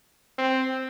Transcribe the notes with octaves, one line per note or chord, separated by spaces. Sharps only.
C4